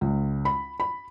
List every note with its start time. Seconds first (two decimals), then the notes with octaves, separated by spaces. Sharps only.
0.01 C#2
0.45 B5
0.80 B5